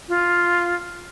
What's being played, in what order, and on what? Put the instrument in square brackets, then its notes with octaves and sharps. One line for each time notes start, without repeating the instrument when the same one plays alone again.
[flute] F4